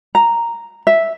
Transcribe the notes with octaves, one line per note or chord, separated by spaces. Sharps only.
A#5
E5